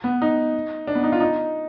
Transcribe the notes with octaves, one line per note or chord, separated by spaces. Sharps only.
B3
D#4
D4
B3
D#4
F4
D#4